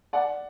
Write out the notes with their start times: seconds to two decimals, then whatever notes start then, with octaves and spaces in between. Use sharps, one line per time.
0.13 D5 F#5